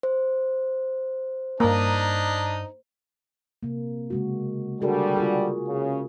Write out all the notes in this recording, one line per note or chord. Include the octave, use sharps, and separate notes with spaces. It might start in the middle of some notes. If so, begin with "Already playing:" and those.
C5
G2 A#3 D4 D#4 D#5 A#5
C3 A#3
C#3 G#3 F#4
D3 G3 F#4 G#4 A#4
F4 G#4
C#3